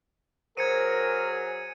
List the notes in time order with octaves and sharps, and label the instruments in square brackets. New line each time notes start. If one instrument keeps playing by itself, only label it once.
[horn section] F#3 G#4 [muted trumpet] A#4 [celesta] C5 [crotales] G#6 C#7 D#7